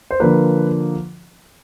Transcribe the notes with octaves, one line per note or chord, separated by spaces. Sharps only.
C5
D3 F3 A#3 B4